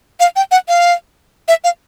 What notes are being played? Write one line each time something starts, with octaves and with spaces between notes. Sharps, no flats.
F5
G5
F#5
F5
E5
F5